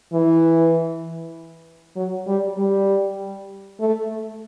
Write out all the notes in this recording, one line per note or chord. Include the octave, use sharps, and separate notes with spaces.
E3
F#3
G3
G3
A3